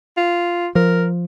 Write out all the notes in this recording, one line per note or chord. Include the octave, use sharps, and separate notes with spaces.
F4
F3 A#4